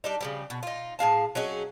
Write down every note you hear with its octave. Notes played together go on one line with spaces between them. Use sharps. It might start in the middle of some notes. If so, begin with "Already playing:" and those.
G3 D4 D#4
C#3 F3 G3
B2
D#4 F4
A2 G#4 F5 A5
F#3 C#4 D#4 G#4